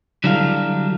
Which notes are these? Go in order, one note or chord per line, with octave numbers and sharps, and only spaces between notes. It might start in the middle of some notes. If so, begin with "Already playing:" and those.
D3 F#3 G3 E4 A4 F5